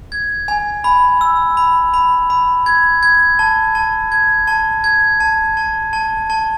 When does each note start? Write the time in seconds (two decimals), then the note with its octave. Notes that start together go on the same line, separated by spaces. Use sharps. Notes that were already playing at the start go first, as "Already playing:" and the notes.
0.12 G#6
0.48 G#5
0.84 B5
1.21 E6
1.57 B5
1.94 B5
2.30 B5
2.66 G#6
3.03 G#6
3.39 A5
3.75 A5
4.12 G#6
4.47 A5
4.84 G#6
5.20 A5
5.57 A5
5.93 A5
6.30 A5